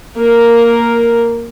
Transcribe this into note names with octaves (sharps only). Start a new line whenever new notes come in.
A#3 A#4